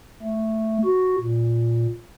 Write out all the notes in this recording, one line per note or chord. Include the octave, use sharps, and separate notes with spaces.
A3
F#4
A#2